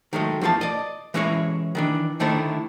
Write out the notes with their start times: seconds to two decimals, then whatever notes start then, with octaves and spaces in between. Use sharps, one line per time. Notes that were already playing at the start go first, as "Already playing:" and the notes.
0.13 D#3 F#3 G#3 A3
0.41 E2 E3 F3 G4 A5
0.61 D5 D#5
1.14 E3 G#3 C#4 E4 G#4 C#5
1.75 D#3 E3 D4
2.20 D3 D#3 A3 D#4 E4 C5